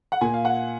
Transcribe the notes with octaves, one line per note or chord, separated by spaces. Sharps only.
F#5
A#2 G#5
F5
F#5